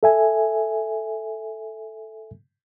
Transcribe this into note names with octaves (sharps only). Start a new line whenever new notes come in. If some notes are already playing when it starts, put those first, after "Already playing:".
A4 E5 G#5